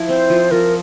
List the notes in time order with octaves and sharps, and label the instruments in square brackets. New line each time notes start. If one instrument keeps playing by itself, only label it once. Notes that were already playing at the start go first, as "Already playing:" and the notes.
Already playing: [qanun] F3 E4
[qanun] C4 [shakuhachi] C5
[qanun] F3
[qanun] F3 [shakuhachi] A#4